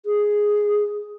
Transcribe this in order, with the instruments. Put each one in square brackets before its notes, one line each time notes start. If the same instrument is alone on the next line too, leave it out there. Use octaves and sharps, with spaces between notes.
[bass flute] G#4